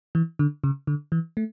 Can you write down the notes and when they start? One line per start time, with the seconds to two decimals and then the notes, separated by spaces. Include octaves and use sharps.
0.15 E3
0.39 D3
0.64 C#3
0.87 D3
1.12 E3
1.37 A3